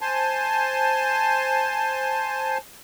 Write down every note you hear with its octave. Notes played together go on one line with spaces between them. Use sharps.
C5 G#5 A5 C6